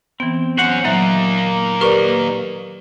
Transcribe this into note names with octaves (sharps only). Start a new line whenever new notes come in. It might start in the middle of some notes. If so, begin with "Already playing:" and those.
E3 B3 C4
C#4 F#4 C5 F#5
A#2 F#3 A#3 D#4 E5 F#6
G4 A#4 B4 D5 C#6